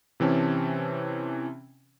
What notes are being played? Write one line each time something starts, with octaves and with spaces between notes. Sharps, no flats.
C3 E3 C4 C#4 A5